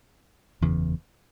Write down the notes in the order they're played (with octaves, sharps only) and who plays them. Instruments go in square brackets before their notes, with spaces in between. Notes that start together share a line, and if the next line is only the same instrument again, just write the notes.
[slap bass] F#1 E2 C#3 E3